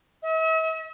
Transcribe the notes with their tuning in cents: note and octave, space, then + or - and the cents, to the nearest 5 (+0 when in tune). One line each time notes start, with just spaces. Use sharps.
E5 -45